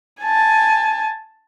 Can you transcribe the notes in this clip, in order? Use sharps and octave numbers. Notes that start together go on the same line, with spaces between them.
G#5 A5